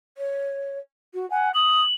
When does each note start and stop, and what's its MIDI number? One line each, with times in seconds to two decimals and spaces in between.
0.18 0.78 73
1.14 1.28 66
1.30 1.52 78
1.30 1.49 80
1.54 1.81 87
1.54 1.94 102